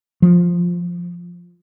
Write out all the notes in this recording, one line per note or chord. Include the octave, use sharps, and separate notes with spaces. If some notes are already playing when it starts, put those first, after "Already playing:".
F3